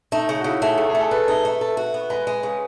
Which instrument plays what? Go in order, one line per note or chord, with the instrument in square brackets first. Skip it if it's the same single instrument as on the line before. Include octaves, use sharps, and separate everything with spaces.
[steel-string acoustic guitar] A3 [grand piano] D#4
[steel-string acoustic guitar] C#3
[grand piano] F#4
[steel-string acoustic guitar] C#3 [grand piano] E4
[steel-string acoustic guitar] A3 [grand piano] G#4
[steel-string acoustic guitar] E2 [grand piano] A4
[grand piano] G#4
[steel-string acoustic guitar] A3
[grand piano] A4
[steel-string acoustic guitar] A4 [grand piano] B4
[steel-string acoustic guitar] D#4
A3
A4
F#4
B3
[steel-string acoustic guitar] G#3 [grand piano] B4
[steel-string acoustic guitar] G#3
C#3